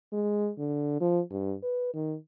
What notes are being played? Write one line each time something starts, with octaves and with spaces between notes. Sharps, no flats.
G#3
D3
F3
G2
B4
D#3